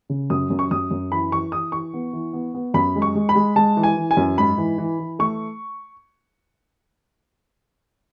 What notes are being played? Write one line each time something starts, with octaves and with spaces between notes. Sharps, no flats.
C#3
F#2 D#6
F#2
C#6
F#2 D#6
F#2
E3 B5
E3 C#6
E3 D#6
E3 C#6
B3
E3
B3
B3
F#2 B5
G#3
C#6
G#3
B5
G#3
G#3 A5
E3
G#5
E3
G#5
F#2
G#2 B5
E3
E3
E3
A3 C#6